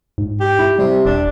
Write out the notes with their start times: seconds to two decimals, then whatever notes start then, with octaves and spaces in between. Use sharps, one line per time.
0.18 G#2
0.41 G4
0.59 E4
0.79 C3 G3
1.06 E1 D4